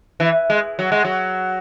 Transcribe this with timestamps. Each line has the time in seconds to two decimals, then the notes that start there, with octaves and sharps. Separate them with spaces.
0.20 E3
0.50 G#3
0.79 F#3
0.92 G#3
1.05 F#3